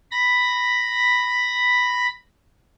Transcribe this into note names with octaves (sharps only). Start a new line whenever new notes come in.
B5 A#6